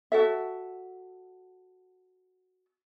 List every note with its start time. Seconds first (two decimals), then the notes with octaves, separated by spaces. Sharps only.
0.12 F#4 A4 E5